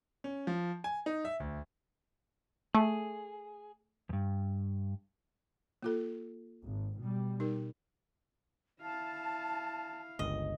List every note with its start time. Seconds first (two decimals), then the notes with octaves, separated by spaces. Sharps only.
0.24 C#4
0.47 F3
0.84 G#5
1.06 D#4
1.25 E5
1.40 D2
2.75 A3 G#4
4.09 E2 G2
5.82 A#3 F4 A4
6.64 G#1
7.01 B2 G3
7.40 D#4 G4 A#4
8.81 E4 F5 A5
10.19 G1 C#2 D#5